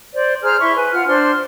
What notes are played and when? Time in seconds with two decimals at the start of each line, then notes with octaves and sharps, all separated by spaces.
0.13 C5 D5
0.42 G#4 C5 A#5 F6
0.60 E4 E5 C6 C#6
0.76 B4 G#5
0.92 F4 F#5 F6
1.07 D4 C5 C6 F6